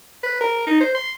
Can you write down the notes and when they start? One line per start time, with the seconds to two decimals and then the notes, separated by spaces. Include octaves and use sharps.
0.23 B4
0.40 A#4
0.67 D#4
0.81 C5
0.95 C6